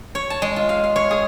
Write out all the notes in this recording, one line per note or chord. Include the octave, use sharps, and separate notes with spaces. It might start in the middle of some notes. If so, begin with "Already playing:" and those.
C#5
A5
G#3
F4
F5
F5
C#5
G#4